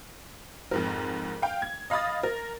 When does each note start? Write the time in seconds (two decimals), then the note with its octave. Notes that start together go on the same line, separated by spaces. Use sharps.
0.71 F2 G#2 A#4
1.42 F5 G5
1.62 G#6
1.90 D#5 F5 B5 D#6 A6
2.23 A#4